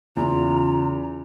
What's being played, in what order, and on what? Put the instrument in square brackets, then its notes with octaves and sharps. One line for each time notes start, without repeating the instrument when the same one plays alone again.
[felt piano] E2 [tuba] C#3 [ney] F4 [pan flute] A#5